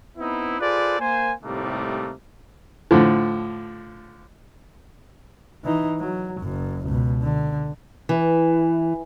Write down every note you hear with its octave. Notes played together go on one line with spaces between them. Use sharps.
B3 C4 D#4 E4
F4 G#4 A4 B4 C5 D5
A#3 C5 G#5
A2 C3 G3 A3 A#3 D#4
A2 D3 F3
E3 D#4
F#3
F#1 F#2
C#2 B2
D3
E3